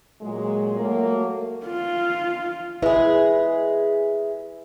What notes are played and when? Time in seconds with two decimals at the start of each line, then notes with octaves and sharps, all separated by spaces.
0.21 A#2 F#3 G#3
0.80 F#3 A3 A#3
1.66 F4
2.82 G#3 E4 G#4 B4 E5